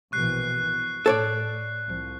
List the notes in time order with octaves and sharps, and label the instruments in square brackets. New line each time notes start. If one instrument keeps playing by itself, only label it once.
[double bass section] A#1 B2 E3 [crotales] C#6 F#6 C7
[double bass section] B2
[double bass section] A2 [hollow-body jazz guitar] A4 C#5 D5
[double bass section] C2 F3